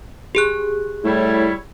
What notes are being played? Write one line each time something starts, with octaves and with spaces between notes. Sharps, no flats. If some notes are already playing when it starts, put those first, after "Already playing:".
G4 G#4 F#6
A2 G3 E4 C#5